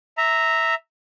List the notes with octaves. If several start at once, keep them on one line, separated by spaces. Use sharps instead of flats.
E5 A#5